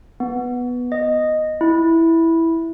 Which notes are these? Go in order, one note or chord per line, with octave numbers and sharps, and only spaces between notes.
B3
D#5
E4